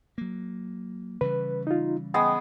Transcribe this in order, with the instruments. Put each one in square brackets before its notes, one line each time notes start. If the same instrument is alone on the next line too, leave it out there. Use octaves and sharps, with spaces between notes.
[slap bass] F#3 A#3
[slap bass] C#3 E3 G3 [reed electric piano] B4
[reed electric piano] D#4 F4
[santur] G#3 B3 [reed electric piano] G5